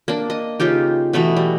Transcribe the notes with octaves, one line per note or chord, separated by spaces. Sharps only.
A#3 D4
D#5
C#3 D#4 F4 G4
B2 E3 A3 B3
G3